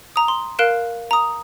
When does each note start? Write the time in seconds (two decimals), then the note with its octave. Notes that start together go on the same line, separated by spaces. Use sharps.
0.16 A#5 D#6
0.28 C6
0.59 A#4 F5 F#6 D7 E7
1.11 A#5 D#6